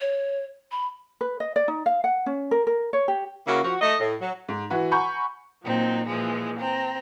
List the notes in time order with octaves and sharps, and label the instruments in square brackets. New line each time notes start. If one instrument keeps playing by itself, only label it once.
[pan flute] C#5
B5
[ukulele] B4
D#5
D5
D#4
F5
F#5
C#4
A#4
A#4
C#5
G4
[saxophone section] C#3 A#3 E4 F#4
F3 F#4
A3 D#5
A2
F#3
[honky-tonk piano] G#2
E3 F#4 B4
F#5 G#5 A#5 B5 C#6 G6
[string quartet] A#2 F#3 C4 D#4
A#2 E3 F3 G#3
C4 A#5